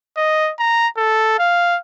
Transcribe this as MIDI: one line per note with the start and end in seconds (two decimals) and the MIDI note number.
0.17 0.51 75
0.59 0.88 82
0.97 1.36 69
1.39 1.77 77